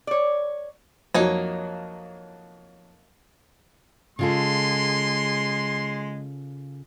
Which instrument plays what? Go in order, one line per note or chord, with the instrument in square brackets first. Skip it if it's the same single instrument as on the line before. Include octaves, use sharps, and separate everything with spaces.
[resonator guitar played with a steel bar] C#5 D5
[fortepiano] F2 F#3 [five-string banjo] A#3 D#4 C#5
[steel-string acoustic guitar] C#3 F4 A4 [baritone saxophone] G#3 [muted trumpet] C6